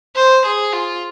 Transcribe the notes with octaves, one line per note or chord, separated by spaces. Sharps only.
C5
G#4
F4